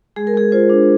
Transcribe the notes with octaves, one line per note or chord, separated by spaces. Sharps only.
G#3 G#4
A#4
G#3 G#4
F4 C5
D4